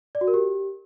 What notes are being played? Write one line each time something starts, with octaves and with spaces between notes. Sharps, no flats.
D5
F#4
A#4
G4